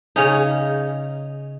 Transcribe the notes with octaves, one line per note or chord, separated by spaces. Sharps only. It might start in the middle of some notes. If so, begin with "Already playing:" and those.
C#3 C#4 D#4